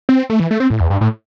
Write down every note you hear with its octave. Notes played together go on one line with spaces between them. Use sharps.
C4
A3
E3
A3
C4
A2
E2
G2
A2